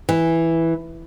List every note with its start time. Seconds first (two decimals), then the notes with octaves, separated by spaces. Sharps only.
0.09 E3